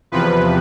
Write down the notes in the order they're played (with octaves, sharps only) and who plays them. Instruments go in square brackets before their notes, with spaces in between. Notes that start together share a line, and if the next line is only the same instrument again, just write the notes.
[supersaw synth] E2 C3 F3 B4